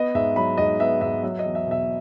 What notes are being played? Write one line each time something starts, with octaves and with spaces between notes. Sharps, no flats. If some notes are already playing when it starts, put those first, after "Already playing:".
Already playing: B3 D#5
G#2 E5
F#3 B5
G#2 D#5
B3 E5
G#2 E5
F#3 E5
D#5
E2
E5
B2 E5